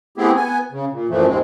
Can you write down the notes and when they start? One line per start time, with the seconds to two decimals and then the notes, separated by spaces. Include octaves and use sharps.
0.18 A3 B3 C4 E4 G4 G#4
0.36 B3 G#5
0.72 C#3
0.92 A#2
1.09 F#2 A#2 E3 F3 A3
1.27 D#2 G#2 G#3 C4